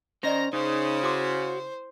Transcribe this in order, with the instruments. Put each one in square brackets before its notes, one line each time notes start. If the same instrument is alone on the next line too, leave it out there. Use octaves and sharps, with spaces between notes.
[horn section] D#3 A#5 [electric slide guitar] C#4 C5 [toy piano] D5 D#5 F#5
[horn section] C#3 [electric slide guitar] D#4 [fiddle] C5
[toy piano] E4 C6 D6 [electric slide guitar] F#4